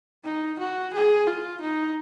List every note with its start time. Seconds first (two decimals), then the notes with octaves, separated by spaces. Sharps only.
0.24 D#4
0.59 F#4
0.93 G#4
1.27 F4
1.61 D#4